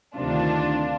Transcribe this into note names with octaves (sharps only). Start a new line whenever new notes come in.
D2 C3 D#3 D4 F4